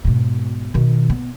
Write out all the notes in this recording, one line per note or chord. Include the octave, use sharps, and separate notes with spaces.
G#2 B2
B2 D#3
B3